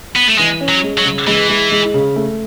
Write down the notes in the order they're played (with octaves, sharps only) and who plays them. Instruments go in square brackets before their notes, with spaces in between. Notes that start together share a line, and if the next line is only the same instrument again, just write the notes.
[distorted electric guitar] B3
A3
[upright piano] E3 [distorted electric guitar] G#3
[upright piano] C#4
[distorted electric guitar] F#3
[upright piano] G#3
[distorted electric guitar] F#3
[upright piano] C#3
[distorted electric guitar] E3 [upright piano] G#3
[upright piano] G#3
G#3
C#3
A3